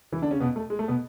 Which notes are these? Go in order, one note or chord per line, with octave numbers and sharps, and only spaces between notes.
E3 E4
D3 D4
C#3 C#4
B2 B3
A3
G#3
A3
B2 B3